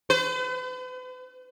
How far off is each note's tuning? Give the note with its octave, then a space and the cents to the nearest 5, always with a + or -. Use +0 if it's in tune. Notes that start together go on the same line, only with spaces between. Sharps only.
B4 +45